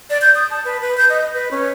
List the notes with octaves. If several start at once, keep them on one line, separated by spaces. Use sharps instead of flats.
D5
G6
D#6
A5
B4
B4
G6
D#5
B4
C#4